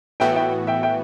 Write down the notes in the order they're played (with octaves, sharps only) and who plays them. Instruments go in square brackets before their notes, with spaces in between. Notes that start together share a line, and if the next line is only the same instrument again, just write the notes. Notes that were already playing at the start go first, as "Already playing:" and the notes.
[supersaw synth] A2 E3 B3 F#4 [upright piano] E5 G5
[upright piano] E5 G5
E5 G5
E5 G5